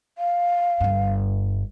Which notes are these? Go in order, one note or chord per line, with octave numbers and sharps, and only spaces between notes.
F5
G1 G2